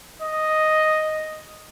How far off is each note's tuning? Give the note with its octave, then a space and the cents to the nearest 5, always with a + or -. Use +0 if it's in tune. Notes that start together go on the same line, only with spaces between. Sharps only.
D#5 +0